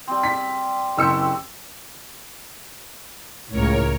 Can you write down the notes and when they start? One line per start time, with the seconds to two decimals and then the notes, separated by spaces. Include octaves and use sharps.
0.07 G3 C4
0.23 B6
0.97 F#1 C4 G4 E6 C#7
3.49 C#2 A2 A#4 C#5